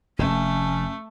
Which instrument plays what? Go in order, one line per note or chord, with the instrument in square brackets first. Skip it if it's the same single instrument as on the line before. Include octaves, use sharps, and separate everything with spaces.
[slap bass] F1 [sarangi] A3 [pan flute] C#4